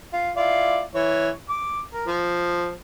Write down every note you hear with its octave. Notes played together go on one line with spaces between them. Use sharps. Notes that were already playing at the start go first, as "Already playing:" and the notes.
F4
E4 F4 D5
E3 C#5
D6
A#4
F3